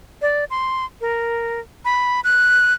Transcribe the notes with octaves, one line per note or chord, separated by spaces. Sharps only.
D5
C6
A#4
B5
F#6